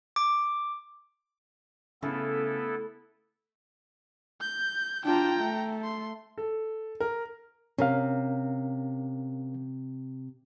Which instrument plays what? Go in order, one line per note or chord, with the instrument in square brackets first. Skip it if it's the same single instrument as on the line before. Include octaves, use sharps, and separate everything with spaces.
[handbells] D6
[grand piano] C#3 [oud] A3 [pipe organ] B3 E4 A4
[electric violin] G6
[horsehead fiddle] D4 F4 [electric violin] G5 A#5
[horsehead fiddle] A3
[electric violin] C6
[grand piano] A4
A#4
[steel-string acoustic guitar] C3 [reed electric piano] C#4 A#4 F5